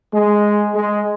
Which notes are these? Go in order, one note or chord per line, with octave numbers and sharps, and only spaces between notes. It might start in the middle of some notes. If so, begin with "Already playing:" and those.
G#3
G#3